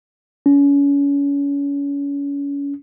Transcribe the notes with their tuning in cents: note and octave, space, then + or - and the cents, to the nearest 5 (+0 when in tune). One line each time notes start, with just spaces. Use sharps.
C#4 +30